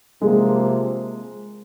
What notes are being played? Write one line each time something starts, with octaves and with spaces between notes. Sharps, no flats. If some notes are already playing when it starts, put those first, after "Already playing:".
C3 F3 G#3 A#3